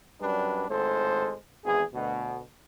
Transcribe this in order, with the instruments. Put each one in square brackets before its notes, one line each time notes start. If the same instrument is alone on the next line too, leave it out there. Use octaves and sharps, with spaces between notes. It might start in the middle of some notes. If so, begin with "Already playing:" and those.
[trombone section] F#2 G3 D4 B4
G#1 A2 G#3 A4 C5
G#1 E2 E3 G#4
D2 B2